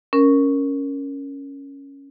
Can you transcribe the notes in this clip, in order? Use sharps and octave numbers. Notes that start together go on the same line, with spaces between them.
C#4 A#4